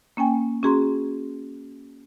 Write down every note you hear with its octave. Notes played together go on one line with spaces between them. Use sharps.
A#3 C#4 G5 G#5
C#4 F#4 G#4 A#5 C6